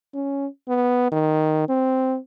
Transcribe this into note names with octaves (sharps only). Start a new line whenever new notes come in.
C#4
B3
D#3
C4